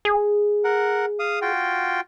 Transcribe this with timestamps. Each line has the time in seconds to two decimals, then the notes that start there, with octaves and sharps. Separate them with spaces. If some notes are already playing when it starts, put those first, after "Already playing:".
0.05 G#4
0.64 A#4 F#5
1.19 F5 D#6
1.42 F4 F#4 G5